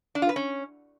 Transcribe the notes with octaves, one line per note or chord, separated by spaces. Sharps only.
D4
F4
B4
C#4